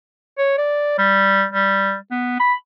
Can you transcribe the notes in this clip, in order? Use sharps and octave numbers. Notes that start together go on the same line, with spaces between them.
C#5
D5
G3
G3
B3
B5